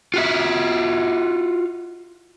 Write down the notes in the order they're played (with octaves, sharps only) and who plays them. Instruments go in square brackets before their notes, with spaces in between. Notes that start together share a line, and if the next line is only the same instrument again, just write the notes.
[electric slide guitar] F4 F#4 E5